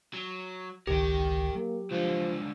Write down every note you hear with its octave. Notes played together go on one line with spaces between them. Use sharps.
F#3
G#1 C#2 D#3 G4 A#4 G5
F#3 A#3
C#2 D3 F3